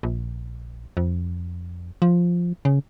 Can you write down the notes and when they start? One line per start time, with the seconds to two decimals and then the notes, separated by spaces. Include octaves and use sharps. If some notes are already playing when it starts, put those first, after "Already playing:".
0.03 A#1
0.97 F2
2.02 F3
2.65 C#3